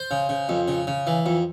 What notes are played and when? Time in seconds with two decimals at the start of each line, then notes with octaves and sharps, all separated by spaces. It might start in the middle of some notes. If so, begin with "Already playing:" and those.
Already playing: C5
0.11 C#3
0.29 C#3
0.49 F2
0.68 C#3
0.87 C#3
1.07 E3
1.26 F2